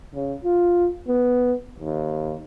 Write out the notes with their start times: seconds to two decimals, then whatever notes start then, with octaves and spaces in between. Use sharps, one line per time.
0.15 C#3
0.45 F4
1.07 B3
1.79 D#2